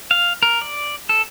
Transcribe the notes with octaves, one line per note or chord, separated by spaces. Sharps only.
F5
A#4
D5
A4